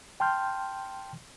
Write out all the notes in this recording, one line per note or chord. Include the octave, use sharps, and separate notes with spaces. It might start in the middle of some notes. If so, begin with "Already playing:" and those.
G5 A5 C6 F6 G6